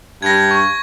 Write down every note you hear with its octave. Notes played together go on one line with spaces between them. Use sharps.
G2 G#6 A#6
C#6